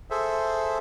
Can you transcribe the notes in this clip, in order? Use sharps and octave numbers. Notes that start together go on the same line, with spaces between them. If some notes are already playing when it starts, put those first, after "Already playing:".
G#4 A4 C5 E5